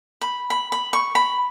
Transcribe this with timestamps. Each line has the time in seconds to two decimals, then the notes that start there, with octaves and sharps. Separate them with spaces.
0.21 B5
0.50 B5
0.72 B5
0.93 C#6
1.15 B5